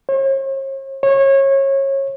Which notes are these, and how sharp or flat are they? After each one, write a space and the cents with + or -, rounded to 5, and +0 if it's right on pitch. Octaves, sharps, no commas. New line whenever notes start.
C#5 -45
C#5 -25